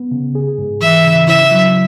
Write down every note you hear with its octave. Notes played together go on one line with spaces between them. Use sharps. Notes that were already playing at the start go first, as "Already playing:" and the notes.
Already playing: B3
C#3
G#4
G#2
E3 E5
C#3
E4 E5
F#3